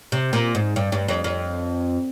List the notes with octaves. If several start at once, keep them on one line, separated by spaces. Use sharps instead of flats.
C3
A#2
G#2
G2
G2
F2
F2